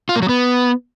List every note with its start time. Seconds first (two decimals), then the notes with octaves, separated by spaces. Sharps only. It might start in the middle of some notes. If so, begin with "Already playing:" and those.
0.09 F4
0.16 A#3
0.22 F#3
0.29 B3